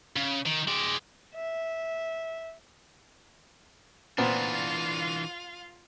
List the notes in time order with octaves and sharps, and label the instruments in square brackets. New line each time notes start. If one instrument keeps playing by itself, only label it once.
[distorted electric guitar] C#3
D#3
G#3 D5
[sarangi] E5
[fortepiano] A#2 B3 C4 [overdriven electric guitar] E3 D4 [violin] F4 F5